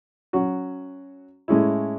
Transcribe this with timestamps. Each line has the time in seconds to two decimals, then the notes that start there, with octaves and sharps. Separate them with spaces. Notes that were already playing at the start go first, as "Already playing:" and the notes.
0.33 F#3 C#4 F#4 C#5
1.48 A2 G#3 C#4 E4